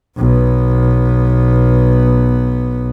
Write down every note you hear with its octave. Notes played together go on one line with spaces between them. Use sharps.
B1 B3